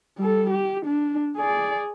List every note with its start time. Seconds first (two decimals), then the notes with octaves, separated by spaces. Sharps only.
0.18 G3 A4
0.50 G4
0.86 D4
1.37 G#4 D5